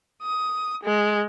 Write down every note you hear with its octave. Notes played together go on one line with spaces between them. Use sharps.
D#6
G#3